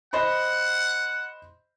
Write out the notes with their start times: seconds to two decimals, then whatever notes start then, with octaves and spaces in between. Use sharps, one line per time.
0.13 C5 D#5 F#5 B5